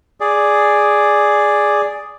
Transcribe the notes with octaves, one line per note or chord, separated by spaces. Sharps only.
G#4 D5